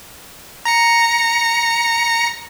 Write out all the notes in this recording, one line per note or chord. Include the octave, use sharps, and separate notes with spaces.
A#5 A#6 C#7